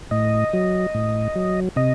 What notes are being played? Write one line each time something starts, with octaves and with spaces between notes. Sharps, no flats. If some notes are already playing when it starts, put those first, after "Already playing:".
A2 D#5
F#3
A2
F#3
C3 D#5